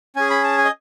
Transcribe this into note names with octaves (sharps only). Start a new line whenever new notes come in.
C#4 G#4 G#5
B5
A5
G#5
D#5